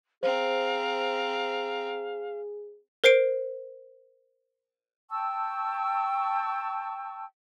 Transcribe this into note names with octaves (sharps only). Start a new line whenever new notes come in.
C4 G#4 C5 F5 A#5
A#4 C5 C7 D7
G5 A5 C#6 E6